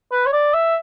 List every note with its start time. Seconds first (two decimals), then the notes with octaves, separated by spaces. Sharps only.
0.12 B4
0.26 C#5
0.33 D5
0.54 E5